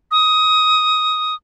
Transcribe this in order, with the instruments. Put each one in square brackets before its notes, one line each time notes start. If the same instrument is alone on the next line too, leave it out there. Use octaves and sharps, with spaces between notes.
[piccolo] D#6